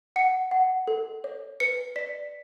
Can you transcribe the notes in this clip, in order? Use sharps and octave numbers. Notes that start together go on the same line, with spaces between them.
F#5 C#7
F#5
A4
C#5
B4 C#7
D5 B6